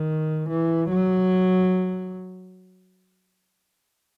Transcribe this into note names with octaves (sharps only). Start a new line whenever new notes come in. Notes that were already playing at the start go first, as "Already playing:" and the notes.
Already playing: D#3
E3
F#3